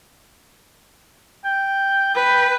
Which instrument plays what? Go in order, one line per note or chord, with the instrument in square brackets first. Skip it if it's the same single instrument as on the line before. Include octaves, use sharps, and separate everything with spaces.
[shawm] G5
[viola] B4 [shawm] G5